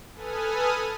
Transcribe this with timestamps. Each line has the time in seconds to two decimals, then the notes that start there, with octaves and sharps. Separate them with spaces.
0.14 A4 B4 G#5 D#6 F6